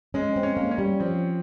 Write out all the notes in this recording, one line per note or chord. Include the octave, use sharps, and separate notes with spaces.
G#3 C#4
C4
C#4
A#3
C#4
G3
F3 C4